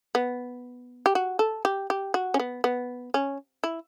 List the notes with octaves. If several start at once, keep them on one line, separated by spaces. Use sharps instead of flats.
B3
G4
F#4
A4
G4
G4
F#4
C#4
B3
B3
C#4
E4